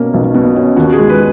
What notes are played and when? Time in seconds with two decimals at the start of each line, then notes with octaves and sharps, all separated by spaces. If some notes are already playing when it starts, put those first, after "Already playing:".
Already playing: B2 A#3 C#4
0.14 B1
0.34 B2
0.56 C#4
0.77 D#2 F#4
0.92 G#4
0.98 G#3
1.09 B4